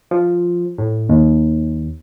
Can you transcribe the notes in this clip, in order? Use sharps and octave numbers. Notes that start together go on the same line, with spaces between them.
F3
A2
D#2